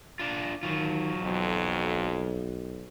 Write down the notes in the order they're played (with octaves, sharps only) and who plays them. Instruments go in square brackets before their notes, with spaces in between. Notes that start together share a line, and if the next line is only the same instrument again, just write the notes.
[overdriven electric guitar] D4 F4
[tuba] D#3 [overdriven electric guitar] F#3 F4
[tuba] B1 [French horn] F2